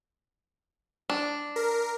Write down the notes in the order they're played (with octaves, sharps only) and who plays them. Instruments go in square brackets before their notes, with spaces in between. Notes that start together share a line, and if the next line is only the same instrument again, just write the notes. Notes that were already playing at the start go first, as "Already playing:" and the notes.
[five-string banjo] D4
[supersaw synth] A#4